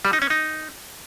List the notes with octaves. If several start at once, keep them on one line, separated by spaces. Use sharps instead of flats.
G3
D#4
C#4
D#4